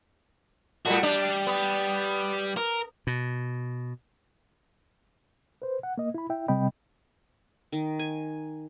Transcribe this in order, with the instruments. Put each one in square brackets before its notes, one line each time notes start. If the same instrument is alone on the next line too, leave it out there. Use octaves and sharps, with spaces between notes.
[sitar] A2 G3 [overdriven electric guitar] F#4
[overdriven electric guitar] G3 [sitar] D4
[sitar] B3
[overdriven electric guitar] A#4
[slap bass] B2
[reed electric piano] B4 C5
F#5
A#3 D#5
E4 B5
E4 E5 G5
C3 G3 C4 D#5 G5 B5
[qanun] D#3
G#5